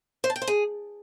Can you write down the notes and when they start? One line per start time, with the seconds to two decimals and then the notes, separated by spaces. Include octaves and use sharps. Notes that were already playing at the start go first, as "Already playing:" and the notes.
0.24 C5
0.30 A5
0.36 G5
0.42 C5
0.47 G#4